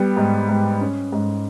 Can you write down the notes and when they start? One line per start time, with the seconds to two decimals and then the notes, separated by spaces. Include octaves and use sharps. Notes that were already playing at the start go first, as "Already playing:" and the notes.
Already playing: G3 B3
0.17 G#2
0.49 G#2
0.81 C#4
1.12 G#2